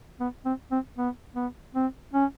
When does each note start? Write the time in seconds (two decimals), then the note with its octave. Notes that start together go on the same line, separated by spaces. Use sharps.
0.20 B3
0.45 C4
0.71 C4
0.97 B3
1.35 B3
1.75 C4
2.13 C#4